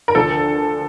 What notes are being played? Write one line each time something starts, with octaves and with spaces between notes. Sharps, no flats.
A#4
D2 D3 F3 A4